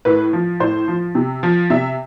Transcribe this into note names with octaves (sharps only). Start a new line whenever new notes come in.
A2 B4
F3
A2 C5
F3
C3
F3
C3 E5